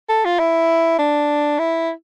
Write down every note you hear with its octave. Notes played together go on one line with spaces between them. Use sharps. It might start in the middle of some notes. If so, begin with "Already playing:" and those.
A4
F4
E4
D4
E4